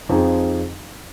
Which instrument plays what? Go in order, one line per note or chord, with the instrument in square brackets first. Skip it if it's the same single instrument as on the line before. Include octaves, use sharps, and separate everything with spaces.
[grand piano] F2 F3 C4 D#4 G#4